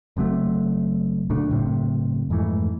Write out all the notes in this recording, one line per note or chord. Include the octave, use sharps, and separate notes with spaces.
F#1 C3 F#3 A3
D2 A#2 A3 D4
F#1 A2 C3
F2 G#2 E3 A3